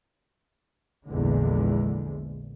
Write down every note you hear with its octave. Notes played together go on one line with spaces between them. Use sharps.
A#1 E2 D3 G#3